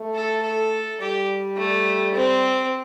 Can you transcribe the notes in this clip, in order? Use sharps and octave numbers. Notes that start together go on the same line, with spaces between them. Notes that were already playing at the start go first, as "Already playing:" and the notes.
Already playing: A3
A4
A4
G3 G4
A3
C4